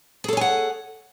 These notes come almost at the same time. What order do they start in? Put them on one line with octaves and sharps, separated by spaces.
G#4 A4 C#5 G#5 F#5